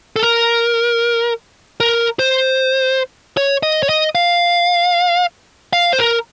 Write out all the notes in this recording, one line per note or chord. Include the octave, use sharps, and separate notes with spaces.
A4
A#4
A#4
C5
C#5
D#5
C#5
D#5
F5
F5
C5
A#4